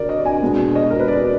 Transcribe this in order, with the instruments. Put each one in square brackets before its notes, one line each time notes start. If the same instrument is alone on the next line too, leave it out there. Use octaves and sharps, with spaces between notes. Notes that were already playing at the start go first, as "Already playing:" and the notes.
Already playing: [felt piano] D3 A#4 D5
D#5
G#5
B2 G#3 B3 D4
D#5
A#4
B4
D5